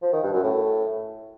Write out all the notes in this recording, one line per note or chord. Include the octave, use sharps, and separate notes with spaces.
F3
D#3
G2
F#2
A2